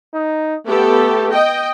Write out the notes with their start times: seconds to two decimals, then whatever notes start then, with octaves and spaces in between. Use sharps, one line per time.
0.14 D#4
0.66 A3 B3 G4 A4
1.32 D#5 G5